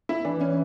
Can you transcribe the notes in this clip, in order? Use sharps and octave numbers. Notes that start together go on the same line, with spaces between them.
E4
E3 D4
C#4